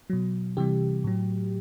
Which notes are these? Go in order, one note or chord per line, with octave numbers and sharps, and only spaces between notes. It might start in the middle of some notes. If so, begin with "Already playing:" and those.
B2 F#3
C3 E3 G3 G4
A2 F#3